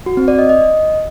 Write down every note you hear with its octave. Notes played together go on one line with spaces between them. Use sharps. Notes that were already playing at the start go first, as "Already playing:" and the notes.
F#4
C4
D5
D#5
D#5